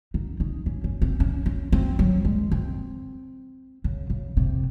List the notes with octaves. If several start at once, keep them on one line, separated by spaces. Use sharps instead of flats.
D#4
D#4
C#4
C#4
C4
C#4
C#4
C4
F#3
G#3
C4
C#3
C#3
C3